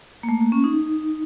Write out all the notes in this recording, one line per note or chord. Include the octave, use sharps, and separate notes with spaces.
A#3
A3
A#3
C#4
D#4